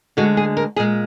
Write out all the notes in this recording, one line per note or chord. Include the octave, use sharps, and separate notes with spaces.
D2 D3 G#3 F#4
G#4
A#4
A#2 G#3 G#4